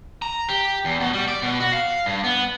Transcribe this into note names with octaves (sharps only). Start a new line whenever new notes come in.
A#5
G4
E2
B2
G3
D5
B2
F#4
F5
G2
B3